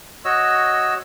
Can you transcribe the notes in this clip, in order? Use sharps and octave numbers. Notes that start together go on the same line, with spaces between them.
F#4 C#5 D#5 E6